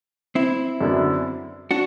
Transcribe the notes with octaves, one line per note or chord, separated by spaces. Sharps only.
C4 E4
F#2 D3 F#3 B3 D4
D4 F#4